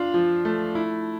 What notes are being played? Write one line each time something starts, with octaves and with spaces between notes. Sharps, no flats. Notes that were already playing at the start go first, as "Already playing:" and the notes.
Already playing: D4 F4
F3
A3
E4